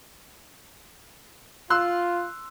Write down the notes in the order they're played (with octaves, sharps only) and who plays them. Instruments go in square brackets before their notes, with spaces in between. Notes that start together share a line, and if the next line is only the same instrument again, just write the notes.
[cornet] F4 [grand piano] C6 E6 F#6